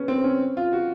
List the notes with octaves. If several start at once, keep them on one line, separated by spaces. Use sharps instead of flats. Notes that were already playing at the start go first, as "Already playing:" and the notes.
Already playing: B3 C#4
C4
C#4
F4
F#4